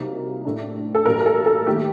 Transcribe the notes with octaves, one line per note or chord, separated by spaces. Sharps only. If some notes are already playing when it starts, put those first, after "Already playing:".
Already playing: C2 C3 F#3 A#3 D#4
A2 A3 D4
A4
A1 G2 F#3 A#3 A#4
A#4
A4
A4
D#2 D#3 F#3 A3 G4